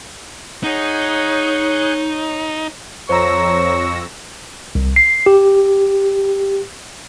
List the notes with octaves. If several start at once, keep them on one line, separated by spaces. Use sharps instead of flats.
D#4 G#4 C#5 F#5 G6
F2 C5 C#5 A#5 C#6 E6 A#6
C2
C7
G4